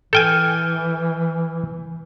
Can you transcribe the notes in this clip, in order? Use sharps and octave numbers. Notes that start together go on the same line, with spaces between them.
E3 A4 G5 G#5 F6 G6